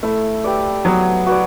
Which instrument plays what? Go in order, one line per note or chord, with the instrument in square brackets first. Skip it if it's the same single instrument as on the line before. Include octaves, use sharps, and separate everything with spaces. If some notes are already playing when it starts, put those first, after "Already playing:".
[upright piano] A3 [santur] E4
[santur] G4 B4 D5
[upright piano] F#3 [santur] B3
[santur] F#4 B4 D5